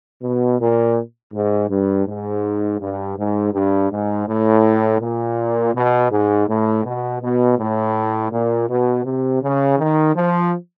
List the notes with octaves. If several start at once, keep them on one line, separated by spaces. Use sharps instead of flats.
B2
A#2
G#2
G2
G#2
G2
G#2
G2
G#2
A2
A#2
B2
G#2
A2
B2
B2
A2
A#2
B2
C3
C#3
D#3
F3